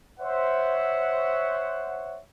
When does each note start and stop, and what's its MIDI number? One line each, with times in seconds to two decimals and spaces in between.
0.20 2.20 72
0.20 2.20 73
0.20 2.20 76
0.20 2.20 78